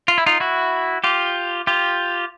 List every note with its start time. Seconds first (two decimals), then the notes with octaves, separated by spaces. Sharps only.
0.08 F4
0.18 E4
0.26 D#4 F4
0.40 E4 F#4
1.04 F4 G4
1.67 F4 G4